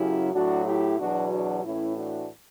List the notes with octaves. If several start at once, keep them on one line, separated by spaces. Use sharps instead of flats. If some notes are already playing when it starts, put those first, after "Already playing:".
Already playing: F#2 C#3 F#3 E4 G4
A2 F#3 D4 F#4
E4 G4
E2 B2 F#3 D4 F#4
D4 F#4
A2 E3 C#4 E4
D4 F#4